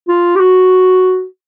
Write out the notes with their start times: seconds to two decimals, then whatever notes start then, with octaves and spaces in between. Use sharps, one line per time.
0.08 F4
0.36 G4
0.40 F#4